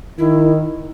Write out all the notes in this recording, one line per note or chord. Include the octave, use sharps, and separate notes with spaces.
D#3 E4